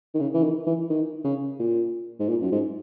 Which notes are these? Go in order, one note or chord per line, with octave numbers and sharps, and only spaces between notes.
D#3
C#3
E3
D#3
E3
D#3
C#3
A#2
G#2
A#2
F#2
G#2